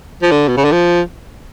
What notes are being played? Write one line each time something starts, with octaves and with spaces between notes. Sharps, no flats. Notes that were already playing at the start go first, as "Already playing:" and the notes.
F3
D3
B2
C#3
D3
F3